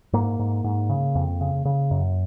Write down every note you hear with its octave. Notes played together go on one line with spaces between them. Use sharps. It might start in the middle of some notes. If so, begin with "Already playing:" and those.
G#2 A#3
G#2
G#2
C#3
F2
C#3
C#3
F#2